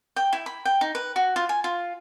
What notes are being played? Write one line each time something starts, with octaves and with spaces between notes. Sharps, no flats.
G5
E4
B5
G5
D#4
B4
F#4
F4
G#5
F4